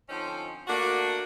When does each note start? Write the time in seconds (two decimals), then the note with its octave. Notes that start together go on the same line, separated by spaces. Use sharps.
0.09 D3 F3 C4 C#4 D#4 C5
0.67 A3 A#3 D4 F#4